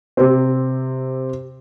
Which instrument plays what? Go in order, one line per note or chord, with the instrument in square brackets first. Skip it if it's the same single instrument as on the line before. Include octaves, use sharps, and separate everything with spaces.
[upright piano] C3 C4